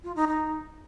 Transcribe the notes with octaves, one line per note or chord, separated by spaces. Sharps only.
F4
D#4
D#4